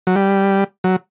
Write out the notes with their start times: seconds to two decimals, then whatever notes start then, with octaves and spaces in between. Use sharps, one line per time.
0.07 F#3
0.16 G3
0.84 F#3